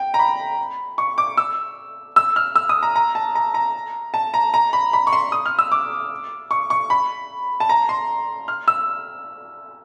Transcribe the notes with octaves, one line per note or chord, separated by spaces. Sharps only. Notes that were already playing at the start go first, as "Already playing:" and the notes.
Already playing: G5
A#5
B5
C#6
D6
E6
E6
F6
E6
D#6
A#5
A#5
A5
A#5
A#5
A5
A#5
A#5
B5
B5
C#6
C6
D#6
F6
E6
D6
C#6
C#6
B5
A5
A#5
C6
F6
E6